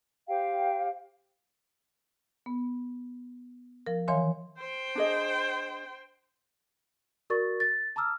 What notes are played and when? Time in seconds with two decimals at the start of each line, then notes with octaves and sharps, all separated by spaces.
0.28 G4 C5 F5 G5
2.46 B3
3.86 F3 A#4
4.08 D#3 E3 C#5 F5 G#5 C6
4.57 C5 G5
4.95 D4 G#4 D#5
7.30 F#4 A#4 D5 C#6 A6
7.60 A6
7.96 A5 A#5 D6 E6 F6